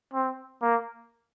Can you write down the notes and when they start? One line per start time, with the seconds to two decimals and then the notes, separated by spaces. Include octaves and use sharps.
0.14 C4
0.62 A#3